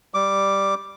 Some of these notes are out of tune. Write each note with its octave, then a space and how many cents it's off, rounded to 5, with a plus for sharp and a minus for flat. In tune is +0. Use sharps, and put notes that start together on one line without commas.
G3 +0 D6 +0